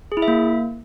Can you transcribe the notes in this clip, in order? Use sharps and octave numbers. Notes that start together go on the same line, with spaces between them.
G#4
E4
E5
A#3